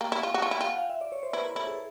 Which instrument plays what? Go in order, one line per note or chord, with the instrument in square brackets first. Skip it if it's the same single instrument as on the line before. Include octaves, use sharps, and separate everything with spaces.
[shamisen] A#3 [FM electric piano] G5
[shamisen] E4
F4
F#4
[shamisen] F4 [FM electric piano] G#5
[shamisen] E4
[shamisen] F4 [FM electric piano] G5
[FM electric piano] F#5
F5
E5
D5
C#5
C5
[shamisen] E4 [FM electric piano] B4
[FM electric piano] A#4
[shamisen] E4 [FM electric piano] A4
[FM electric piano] G#4